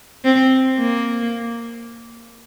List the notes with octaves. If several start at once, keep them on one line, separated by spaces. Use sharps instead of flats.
C4
A#3